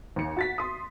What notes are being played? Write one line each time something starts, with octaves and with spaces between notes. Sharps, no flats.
D#2 C#7
F#4 A6 B6
C6 D#6